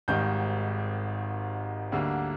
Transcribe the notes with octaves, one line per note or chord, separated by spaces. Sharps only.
G#1 G#2 D#3 G3 G6
D2 D3 G3 A#3